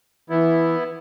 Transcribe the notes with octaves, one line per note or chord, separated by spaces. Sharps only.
E3 B3 E4